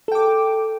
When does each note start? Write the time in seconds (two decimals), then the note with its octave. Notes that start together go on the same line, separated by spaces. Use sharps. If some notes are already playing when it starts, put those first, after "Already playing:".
0.08 A4
0.12 G5
0.15 D6